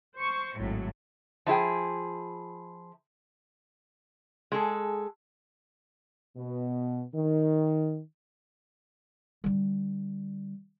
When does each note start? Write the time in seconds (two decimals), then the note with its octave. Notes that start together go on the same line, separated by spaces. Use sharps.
0.17 C5 C#6
0.58 G#1 A2 F#3
1.46 F3 E4 G#4 G5
4.52 G#3 G#4 A4
6.37 B2
7.15 D#3
9.44 D3 G3